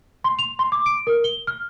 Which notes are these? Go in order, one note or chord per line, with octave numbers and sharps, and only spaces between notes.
C6
F7
C6
D6
D7
A#4
G7
F6